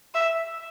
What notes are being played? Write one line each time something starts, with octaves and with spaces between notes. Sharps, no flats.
E5